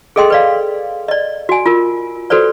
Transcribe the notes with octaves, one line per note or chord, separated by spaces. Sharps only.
G#4 A4 D#5 G5 C6
B4 D5 F5
D5 D#5
F#4 G#5
F4 A#4
F#4 A4 B4 C5 D5